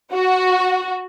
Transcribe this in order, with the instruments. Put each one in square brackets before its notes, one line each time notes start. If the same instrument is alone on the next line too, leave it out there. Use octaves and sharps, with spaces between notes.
[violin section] F#4